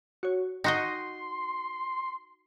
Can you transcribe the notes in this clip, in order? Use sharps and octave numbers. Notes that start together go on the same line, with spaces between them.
F#4 C#5
D#4 F#4 D#5 G5 C6 D#6 C#7